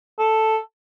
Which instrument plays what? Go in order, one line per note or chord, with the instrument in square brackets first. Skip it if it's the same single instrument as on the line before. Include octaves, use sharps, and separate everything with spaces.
[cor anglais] A4